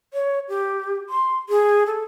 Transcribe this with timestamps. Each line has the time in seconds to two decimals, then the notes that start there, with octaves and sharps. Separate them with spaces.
0.14 C#5
0.49 G4
1.09 C6
1.49 G#4
1.86 A4